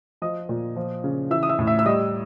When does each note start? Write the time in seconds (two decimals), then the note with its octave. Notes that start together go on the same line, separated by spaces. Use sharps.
0.22 F3 D#5 D#6
0.49 A#2
0.76 F3
1.04 C#3
1.31 E3 E5 E6
1.43 D#6
1.49 E5 E6
1.59 A2
1.67 E5 E6
1.79 E6
1.86 G3 D#5 D#6